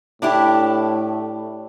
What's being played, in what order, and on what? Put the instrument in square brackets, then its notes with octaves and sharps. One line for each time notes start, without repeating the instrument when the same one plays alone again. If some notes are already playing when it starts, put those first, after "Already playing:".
[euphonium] A2 [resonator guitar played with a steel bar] D4 E4 G4